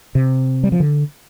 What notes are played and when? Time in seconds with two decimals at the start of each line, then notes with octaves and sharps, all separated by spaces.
0.15 C3
0.63 G3
0.72 F3
0.80 D3